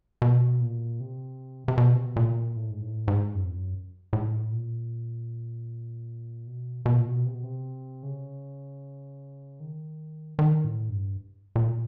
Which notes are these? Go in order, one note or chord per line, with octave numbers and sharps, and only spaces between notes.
B2
A#2
C3
C3
B2
C3
B2
A#2
A2
G#2
A2
G#2
F#2
F2
F#2
A2
A#2
B2
B2
A#2
B2
C3
B2
C3
C#3
D#3
D#3
A2
G2
A#2